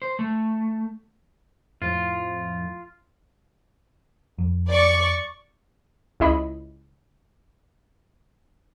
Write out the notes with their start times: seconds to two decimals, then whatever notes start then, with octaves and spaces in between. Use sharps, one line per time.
0.02 C5
0.19 A3
1.82 F2 A2 F3 F4
4.38 F2
4.69 D5 C#6
6.20 C#2 E4 D#5 B5